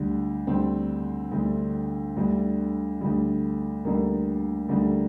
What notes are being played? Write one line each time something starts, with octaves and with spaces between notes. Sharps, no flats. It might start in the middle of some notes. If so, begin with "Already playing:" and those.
Already playing: D2 D3 G3
D2 D3 G3 C4
D2 D3 G3
D2 D3 G3
D2 D3 G3
D2 D3 G3 A#3
D2 D3 G3